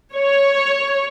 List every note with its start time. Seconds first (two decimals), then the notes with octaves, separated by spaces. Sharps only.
0.15 C#5